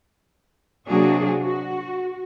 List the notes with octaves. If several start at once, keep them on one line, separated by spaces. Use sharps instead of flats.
C3 F#3 A#3 D4 F#4 G#4
F#4